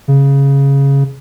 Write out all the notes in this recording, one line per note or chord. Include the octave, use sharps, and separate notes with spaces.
C#3